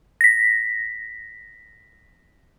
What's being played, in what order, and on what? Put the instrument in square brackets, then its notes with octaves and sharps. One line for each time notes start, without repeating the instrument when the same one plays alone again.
[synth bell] A#6 B6